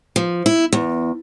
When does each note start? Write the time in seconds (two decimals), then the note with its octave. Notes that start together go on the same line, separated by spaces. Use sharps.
0.16 F3
0.46 E4
0.73 E2